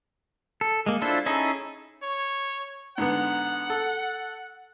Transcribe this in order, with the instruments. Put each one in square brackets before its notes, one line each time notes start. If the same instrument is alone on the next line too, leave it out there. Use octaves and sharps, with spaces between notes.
[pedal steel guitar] A4
G#3 A#3
D4 E4 F4 A4 C5
C#4 D#4 E4 G#4 A4
[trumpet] C#5
[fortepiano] G#2 D3 B3 [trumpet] F#5
[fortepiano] A4